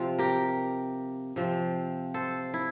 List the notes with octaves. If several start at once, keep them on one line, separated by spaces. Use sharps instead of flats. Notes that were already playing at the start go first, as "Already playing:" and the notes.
Already playing: C3 F3 C4 F4
G4 A#4
C3 F3 C4
A4 C5
E4